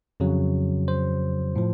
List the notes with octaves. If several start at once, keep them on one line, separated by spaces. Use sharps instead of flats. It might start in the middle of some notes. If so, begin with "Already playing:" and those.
F2 C#3 F#3
C5
A2 F3